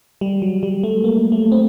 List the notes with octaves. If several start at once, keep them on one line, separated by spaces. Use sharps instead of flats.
G3
F#3
G3
A3
A#3
A3
C4